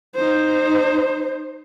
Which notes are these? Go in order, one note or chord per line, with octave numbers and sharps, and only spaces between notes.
D#4 C5